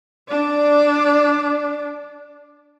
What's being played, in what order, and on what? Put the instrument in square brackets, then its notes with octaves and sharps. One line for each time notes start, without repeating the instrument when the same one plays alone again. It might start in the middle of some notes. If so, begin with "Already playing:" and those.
[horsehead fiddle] D4 D5